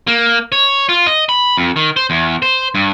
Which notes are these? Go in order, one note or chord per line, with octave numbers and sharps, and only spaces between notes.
A#3
C#5
F4
D#5
B5
F2
D#3
C5
E2
C5
G2